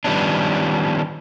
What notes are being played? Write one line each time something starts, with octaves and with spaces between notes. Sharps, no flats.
D#3 F3 G3 B3 C#4 D4